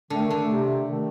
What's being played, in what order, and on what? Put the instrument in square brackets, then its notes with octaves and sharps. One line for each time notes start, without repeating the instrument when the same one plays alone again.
[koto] D3 [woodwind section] D#3 A3
[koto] D3
[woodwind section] C3
D#3 A3